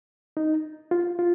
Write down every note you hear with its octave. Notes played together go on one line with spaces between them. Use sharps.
D#4
F4
F4